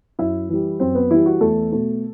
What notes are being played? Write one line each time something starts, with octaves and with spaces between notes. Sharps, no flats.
F#2 E4 E5
E3 G3
F#2 C4 C5
B3 B4
E3 G3 E4
F#4
E2 A3 A4
B2 A3